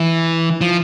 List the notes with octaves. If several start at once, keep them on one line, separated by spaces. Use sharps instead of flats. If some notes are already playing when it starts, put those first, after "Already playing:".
Already playing: E3
F3